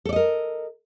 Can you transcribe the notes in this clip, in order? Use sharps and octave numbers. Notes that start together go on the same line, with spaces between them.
A4 A#4 D5 D#5